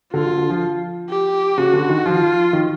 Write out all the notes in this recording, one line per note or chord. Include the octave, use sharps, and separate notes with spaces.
D3 F4
D3
D3
F3
G4
C#3 F#4
D3
D#3
F3 F4
D#3